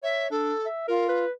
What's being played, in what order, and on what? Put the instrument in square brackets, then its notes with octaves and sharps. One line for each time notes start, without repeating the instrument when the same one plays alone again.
[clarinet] C#5 [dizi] E5
[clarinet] D4 [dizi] A4
[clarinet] E5
[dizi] F4 [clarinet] A#4
[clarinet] B4